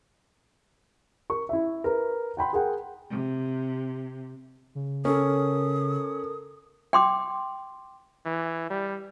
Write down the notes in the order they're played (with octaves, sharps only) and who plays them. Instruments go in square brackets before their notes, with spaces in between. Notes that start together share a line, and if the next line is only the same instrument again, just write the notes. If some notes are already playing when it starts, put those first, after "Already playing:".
[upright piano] A#4 C#6
E4 E5
A#4 B4
F#5 G5 B5 C6
G#4 A#4 F#5 G5
[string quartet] C3
[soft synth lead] C#3
[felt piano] C#4 [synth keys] A4 A#4 [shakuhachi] D#6
[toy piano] G5 C6 D6
[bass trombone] E3
G3